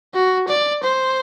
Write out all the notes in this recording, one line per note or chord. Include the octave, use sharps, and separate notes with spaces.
F#4
D5
C5